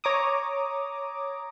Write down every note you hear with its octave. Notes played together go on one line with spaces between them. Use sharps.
C#5 A#5 D6 D#6